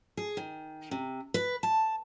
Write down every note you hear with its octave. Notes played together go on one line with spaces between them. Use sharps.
G#4
D#3
C3
B4
A5